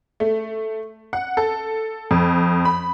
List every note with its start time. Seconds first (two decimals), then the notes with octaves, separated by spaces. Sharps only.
0.20 A3
1.13 F#5
1.37 A4
2.11 F2
2.65 B5